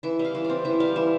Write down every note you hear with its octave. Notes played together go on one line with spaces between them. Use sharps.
E3 E5
G3
F5
E3
C4 D5
E3 E5
G3 F5
E3 E5